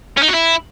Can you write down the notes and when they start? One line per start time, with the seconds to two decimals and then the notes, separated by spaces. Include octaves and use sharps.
0.17 C#4
0.23 D#4
0.29 F#4
0.34 E4